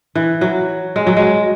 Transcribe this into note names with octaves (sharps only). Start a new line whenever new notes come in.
E3
F#3
G#3
F#3
G#3